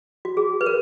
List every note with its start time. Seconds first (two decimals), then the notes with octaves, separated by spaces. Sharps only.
0.25 F#4
0.37 G#4
0.61 B4
0.66 A#4